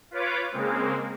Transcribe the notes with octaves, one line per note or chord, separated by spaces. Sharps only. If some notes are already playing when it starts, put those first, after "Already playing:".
F4 B4 C#5 D6
C#3 G#3 A#3 C4